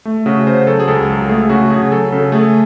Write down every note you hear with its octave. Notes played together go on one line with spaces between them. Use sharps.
A3
C#3 F#4
C#3 C5
F#3 A4
G#4
C#2 A4
F#3 A4
A3 G#4
C#3 F#4
C#3 G#4
F#3 A4
C#3 A4
A3 G#4